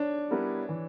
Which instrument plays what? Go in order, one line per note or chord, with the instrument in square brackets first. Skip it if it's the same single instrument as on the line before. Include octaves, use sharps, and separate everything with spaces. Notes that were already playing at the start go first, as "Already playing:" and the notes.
Already playing: [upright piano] D4 C#5
[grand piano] G3 B3 E4 A#4
E3